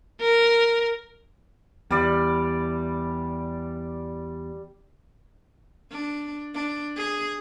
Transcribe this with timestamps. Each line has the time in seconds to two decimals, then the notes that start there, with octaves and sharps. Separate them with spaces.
0.21 A#4
1.91 E2 G3 D5
5.91 D4
6.54 D4
6.96 G#4